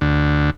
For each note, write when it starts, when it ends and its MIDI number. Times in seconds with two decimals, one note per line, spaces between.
0.01 0.50 38